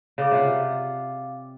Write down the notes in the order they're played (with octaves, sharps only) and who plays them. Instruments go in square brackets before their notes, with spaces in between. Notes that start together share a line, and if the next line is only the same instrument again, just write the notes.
[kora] C#3 D5 F#5 [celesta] F5 D6
[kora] C3 F4 F#5